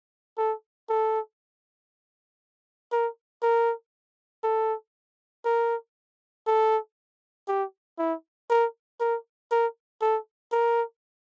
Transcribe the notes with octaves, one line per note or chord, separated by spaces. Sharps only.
A4
A4
A#4
A#4
A4
A#4
A4
G4
E4
A#4
A#4
A#4
A4
A#4